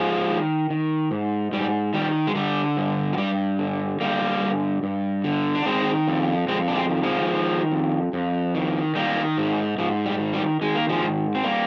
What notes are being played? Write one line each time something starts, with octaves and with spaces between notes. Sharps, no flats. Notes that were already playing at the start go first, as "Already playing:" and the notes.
Already playing: G#2 F3 G#3
D#3
D#3
G#2
G#2 G3
D#3 G3
G#3
D3 G3
G2
F3
G2 G3
D3
D3 G3 A#3
G2
G2
D3
D4
D#3 G#3 C4
F2
F2 G#3 C4
D4
G#3 C4
D#3
F3 G#3
D#3
F2
F2
D#3
D#3 G3 A#3
G#2
G#2 F3
G3
D#3
G3
D#3 G#3
A#3
F3 G#3
G#2
C4
G3 A#3